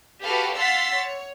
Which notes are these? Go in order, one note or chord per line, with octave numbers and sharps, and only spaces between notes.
F#4 G4 A4 B4 F5
F5 F#5 C6 E6 A6 B6
C#5